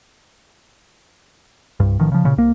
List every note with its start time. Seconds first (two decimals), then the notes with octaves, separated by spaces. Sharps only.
1.80 C2 G2
1.99 A1 D#3 F3
2.12 C#3 F3
2.24 A#2 C#3
2.37 C2 A#3